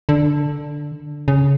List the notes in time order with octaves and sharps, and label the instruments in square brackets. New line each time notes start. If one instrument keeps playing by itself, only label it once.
[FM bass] D3
C#3